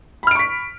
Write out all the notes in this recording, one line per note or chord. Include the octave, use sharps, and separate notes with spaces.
B5 C#6 F6 B6 D7